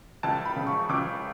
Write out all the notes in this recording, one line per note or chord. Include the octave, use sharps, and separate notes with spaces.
C#2 A5
B5
C#3
C#6
C#2 D6